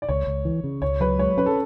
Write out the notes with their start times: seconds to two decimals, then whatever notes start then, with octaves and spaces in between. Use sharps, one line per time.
0.02 D5
0.09 C#2 C#5
0.27 C#2
0.45 E3
0.64 C#3
0.82 C#2 C#5
1.00 F#3 B4
1.19 G#3 C#5
1.37 C#4 B4
1.46 A4